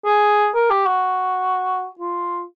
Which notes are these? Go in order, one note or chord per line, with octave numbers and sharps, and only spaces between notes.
G#4
A#4
G4
F#4
F4